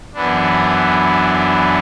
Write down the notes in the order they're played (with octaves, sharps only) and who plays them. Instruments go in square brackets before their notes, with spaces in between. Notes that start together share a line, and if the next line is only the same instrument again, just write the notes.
[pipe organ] F#2 E3 B3 D4